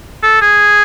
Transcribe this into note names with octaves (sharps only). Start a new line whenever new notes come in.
A4
G#4